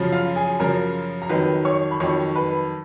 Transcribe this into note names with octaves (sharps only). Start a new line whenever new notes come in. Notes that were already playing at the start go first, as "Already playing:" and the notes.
Already playing: F#2 C#3 F3
F4 F5
G#4 G#5
F#2 C#3 F3 A#4 A#5
A#5
F2 D#3 F#3 B4 B5
C#5 C#6
B5
F2 D#3 F#3 C#5 C#6
B4 B5